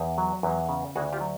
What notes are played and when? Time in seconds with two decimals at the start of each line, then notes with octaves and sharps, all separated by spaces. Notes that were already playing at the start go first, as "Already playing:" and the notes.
Already playing: E2
0.18 F#3
0.43 E2
0.69 C#3
0.96 D2 F#4 G#4
1.13 F4 G4
1.21 F#3